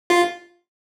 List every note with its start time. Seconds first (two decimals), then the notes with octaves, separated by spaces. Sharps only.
0.10 F4